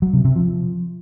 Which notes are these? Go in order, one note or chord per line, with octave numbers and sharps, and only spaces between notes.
F#3
C3
C3
F3